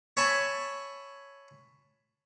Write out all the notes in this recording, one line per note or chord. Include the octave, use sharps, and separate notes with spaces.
C#5 E5 G#5 A5 B5